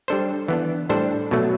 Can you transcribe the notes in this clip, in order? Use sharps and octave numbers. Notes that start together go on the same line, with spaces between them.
G3 D4 A4 C5
E3 B3 D4
A2 G3 D4 A4 C5
B2 F#3 A3